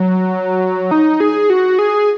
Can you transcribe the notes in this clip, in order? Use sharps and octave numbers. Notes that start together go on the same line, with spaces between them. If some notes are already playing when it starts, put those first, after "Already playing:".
Already playing: F#3
D#4
G#4
F#4
G#4